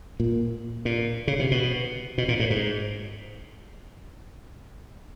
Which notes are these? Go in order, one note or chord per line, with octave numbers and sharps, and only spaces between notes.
A#2
A#2
C#3
C3
B2
B2
A#2
A2
G#2